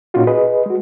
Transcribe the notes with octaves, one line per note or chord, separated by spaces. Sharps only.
A#2 C#4 D#4 F4 F#4
G#4 B4 D#5
G#3 F#4